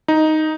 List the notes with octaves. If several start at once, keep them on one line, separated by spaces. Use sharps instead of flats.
D#4